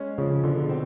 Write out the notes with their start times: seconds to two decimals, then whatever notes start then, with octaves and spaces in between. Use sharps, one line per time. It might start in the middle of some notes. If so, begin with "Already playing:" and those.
Already playing: G#3 C#4
0.18 C#3 F3
0.43 B2 D3
0.69 C4